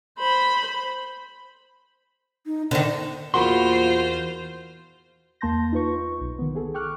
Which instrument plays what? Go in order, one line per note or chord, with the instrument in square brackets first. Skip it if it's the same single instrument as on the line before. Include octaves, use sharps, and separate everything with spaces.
[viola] C5 B5
[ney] D#4
[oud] D3 D#3 [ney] C5
[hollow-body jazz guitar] E2 C6 [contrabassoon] A#2 [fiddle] F4 C5 [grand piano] F#4 B5
[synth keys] E2 A#3 A5 C6 G6 A#6
D#4 F4 B4 C#6
B1
D#3 B3
B3 G#4 A4
G5 C#6 D6 F6 F#6